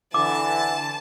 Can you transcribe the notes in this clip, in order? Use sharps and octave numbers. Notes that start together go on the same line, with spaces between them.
D3 E3 A5 D6